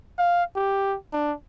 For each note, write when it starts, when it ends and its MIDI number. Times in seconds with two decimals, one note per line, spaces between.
0.19 0.43 77
0.56 0.97 67
1.13 1.33 62